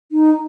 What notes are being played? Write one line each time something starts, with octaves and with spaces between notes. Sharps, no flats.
D#4